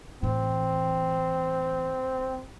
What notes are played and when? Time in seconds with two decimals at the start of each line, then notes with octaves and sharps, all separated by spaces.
0.23 A2 E3 C4